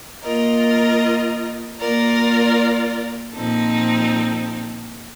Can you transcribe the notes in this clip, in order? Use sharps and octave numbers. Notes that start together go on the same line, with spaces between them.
A#3 F4 A#4 D#5
A#3 F4 A#4 D5
A#2 F3 C4 D#4 A4